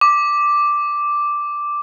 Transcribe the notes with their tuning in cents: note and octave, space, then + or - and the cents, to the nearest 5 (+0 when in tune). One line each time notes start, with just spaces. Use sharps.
D6 +0